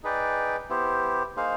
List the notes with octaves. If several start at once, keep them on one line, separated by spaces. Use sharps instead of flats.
D#4 G#4 B4 D5 G5
B3 E4 G4 C5
A#3 D#4 G#4 C5 F5